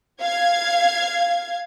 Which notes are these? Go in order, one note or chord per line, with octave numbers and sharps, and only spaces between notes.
F5 G#6